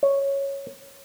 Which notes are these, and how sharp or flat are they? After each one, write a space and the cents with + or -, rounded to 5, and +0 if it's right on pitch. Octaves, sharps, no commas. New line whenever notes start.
C#5 -5